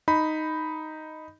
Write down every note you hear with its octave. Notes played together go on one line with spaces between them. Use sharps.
D#4 B5